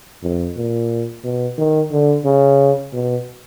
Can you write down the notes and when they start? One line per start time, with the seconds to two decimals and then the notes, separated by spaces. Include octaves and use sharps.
0.23 F2
0.57 A#2
1.24 B2
1.58 D#3
1.91 D3
2.25 C#3
2.93 B2